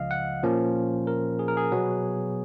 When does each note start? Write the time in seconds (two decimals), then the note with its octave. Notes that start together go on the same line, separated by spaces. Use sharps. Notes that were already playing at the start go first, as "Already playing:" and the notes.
Already playing: C#2 C#3 F3 D#5 F5
0.11 F#5
0.43 A#2 F3 A#3 C#4
1.07 A#4
1.39 G#4
1.48 A#4
1.57 G#4
1.72 B2 F#3 B3